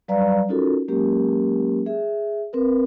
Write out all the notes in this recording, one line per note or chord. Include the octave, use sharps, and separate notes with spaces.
F#3 G3 B4 D5 F5 A#5
C#4 D#4 F4 F#4 A4 A#4
F#3 G#3 A#3 C#4 G4 A#4
G#4 E5
C4 A#4 B4